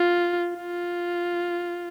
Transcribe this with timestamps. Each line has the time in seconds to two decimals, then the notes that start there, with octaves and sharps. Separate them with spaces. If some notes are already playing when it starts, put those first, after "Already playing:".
Already playing: F4
0.57 F4